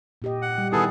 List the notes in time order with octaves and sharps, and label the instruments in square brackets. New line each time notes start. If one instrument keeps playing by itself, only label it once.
[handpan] A#2 G4 D#5
[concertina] F#5
[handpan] G3
[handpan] D#3 E4 [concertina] B3 G#4 A4